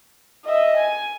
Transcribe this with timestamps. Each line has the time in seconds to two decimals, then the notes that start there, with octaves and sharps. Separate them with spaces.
0.45 D#5 E5
0.77 G#5